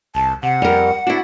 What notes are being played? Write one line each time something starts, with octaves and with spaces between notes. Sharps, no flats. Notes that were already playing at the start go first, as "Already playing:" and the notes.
C2 A5
C3 F#5
F2 G3 A#4
D4 E4 F#4